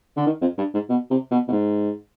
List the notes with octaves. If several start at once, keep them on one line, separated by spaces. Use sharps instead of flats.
D3
D#3
F2
G2
G#2
B2
C3
B2
B2
G#2